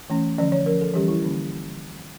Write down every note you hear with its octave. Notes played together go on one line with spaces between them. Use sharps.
E3 A3 C#4
D3 F3 C#4 D5
C#5
F3 C#4 A#4
A4
E3 G3 C#4 G4
E4
D3 F3 A#3 C#4